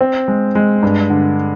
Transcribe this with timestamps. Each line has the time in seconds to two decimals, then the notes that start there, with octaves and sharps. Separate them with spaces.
0.01 C4
0.28 G#3
0.55 G#3
0.83 G2
1.10 D3